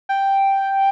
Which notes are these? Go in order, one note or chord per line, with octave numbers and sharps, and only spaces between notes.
G5